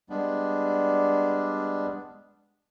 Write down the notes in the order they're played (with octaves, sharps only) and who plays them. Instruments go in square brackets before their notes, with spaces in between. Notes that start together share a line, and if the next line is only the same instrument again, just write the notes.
[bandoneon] G3 G#3 B3 D4